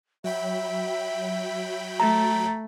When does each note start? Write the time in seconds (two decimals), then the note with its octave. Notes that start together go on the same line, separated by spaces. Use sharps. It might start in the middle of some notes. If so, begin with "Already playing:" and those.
0.24 F#3 E5 G5 B5
2.00 A3 A#5